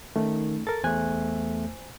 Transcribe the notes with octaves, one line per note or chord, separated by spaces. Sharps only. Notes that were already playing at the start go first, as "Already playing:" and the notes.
D#3 A3 C#4 D#4
A4 A#4 A6
E2 A3 C5 G#5 F#6